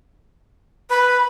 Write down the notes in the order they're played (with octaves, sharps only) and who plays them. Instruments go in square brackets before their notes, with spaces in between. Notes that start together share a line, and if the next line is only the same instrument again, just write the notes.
[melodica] B4 [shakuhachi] B5